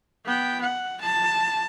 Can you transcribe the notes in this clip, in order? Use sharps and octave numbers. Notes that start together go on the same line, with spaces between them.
B3 G5
F#5
A5